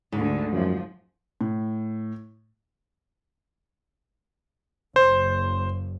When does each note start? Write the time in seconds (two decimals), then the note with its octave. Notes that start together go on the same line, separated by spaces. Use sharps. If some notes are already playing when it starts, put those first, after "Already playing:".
0.12 D2 G#2 D3
0.53 F#2 F3
1.41 A2
4.96 F#1 C5